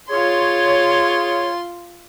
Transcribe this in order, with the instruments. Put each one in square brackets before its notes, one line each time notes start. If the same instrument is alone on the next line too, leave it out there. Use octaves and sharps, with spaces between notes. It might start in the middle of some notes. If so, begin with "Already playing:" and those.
[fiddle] F4 C6 [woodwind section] G#4 C#5